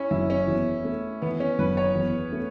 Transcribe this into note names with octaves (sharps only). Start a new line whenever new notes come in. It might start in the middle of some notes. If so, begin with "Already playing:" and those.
Already playing: C#4 E4
F#1 E4
C#4
E2
A3
E3 B3
C#4
F#1 B4
C#5
E2
A3